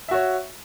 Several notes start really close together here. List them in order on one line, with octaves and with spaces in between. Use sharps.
E5 F#4 C#5